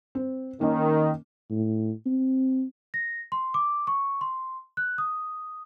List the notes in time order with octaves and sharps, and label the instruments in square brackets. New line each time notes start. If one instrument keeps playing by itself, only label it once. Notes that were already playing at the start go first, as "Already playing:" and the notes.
[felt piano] C4
[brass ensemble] D#3 [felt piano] A#3 C#4
[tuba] A2
C4
[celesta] A#6
C6
D6
C#6
C6
F#6
D#6